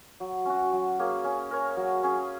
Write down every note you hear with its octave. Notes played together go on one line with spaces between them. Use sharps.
F#3
C#4 F#4
F#3
A#3 C#4 G#4
C#4
A#4 C#5
F#3
C#4 G#4